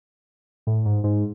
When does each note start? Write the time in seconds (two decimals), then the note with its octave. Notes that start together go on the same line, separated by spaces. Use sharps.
0.67 A2
0.85 G#2
1.04 G#2